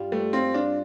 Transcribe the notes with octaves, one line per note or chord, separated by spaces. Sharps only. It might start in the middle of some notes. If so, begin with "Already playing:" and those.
Already playing: G2 G3 F4
G3 A3
C4 F4
D4 F4